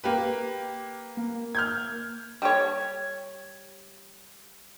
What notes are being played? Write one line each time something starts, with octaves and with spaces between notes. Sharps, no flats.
A#3 G4 B4
A#3
F6 G6 G#6
G3 G4 C#5